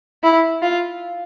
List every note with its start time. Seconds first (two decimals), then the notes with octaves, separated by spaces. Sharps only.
0.23 E4
0.62 F4